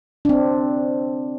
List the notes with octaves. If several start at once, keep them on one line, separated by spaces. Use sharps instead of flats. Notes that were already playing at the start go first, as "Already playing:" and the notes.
C4 D4